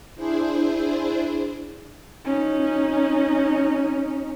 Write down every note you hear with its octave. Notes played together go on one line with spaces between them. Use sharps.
D4 E4 G#4 C5
C#4 D#4